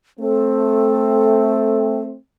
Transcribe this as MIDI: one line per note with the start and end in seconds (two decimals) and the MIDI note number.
0.20 2.15 57
0.20 2.15 60
0.20 2.03 69